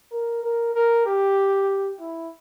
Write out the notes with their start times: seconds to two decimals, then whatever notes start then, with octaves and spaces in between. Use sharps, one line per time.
0.12 A#4
0.43 A#4
0.75 A#4
1.06 G4
2.00 E4